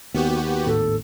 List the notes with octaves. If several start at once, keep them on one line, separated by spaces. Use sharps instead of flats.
D#2 B3 F#4 G4
G#1 A2 C4 A4